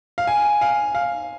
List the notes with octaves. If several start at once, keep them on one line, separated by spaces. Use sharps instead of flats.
F5
G#5
F5
F5